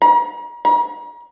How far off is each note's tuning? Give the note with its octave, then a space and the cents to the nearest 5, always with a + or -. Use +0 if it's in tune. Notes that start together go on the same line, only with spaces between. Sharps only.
A#5 +45
A#5 +45